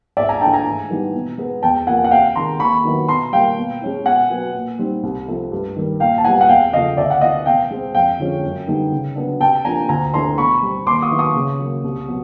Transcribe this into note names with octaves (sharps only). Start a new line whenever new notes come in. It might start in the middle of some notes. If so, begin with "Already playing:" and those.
G#2 D5 E5
G#5 A#5
E3 A3 D4 G5 A5
G#5 A#5
G#2
E3 G3 B3 D#4
B2
G#3 B3
E2 G5 A5
C3 F3 A#3 F#5 G#5
F#5
C3 F5 G5
D#3 G#3 A#5 C6
D#2 B5 C#6
D#3 F#3 B3 E4
B2 A#5 C6
G3 A#3 F5 G5
B2
G#3 C#4 E4
B2 F#5 G#5
F#3 B3
A#2
G3 C4 D#4
C2
C3 F3 A3 C4
G2
D#3 G3
A#2 F5 G5
A5
G3 B3 E4 F#5 G#5
F#5
E2 F5 G5
C#3 F3 A3 D#5 F5
D2 D5 E5
F#5
C3 E3 D#5 F5
B2 F5 G5
G#3 C4
F2 F5 G5
D3 F3 G#3 C#4
F#2
D3 G3 B3 D#4
C#3
F#3 B3 D4
C3 G5 A5
F3 A#3 D4 G#5 A#5
D2 G#5 A#5
C3 E3 A3 D4 A#5 C6
B2 B5 C#6
G3 C4
D#2 C6 D6
C#6 D#6
D#3 F#3 B3 E4
C#6 D#6
C#3
F#3 A#3
C2
B2 F#3